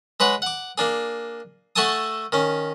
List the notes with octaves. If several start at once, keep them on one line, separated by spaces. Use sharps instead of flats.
G#3 B4 C#5 F#5
F#5 D6
A#3 D4 G#4
A3 F#4 A4 G#5 A5 D#6
D#3 C#4